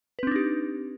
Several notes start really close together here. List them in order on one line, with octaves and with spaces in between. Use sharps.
B4 C4 D4 D#4 G4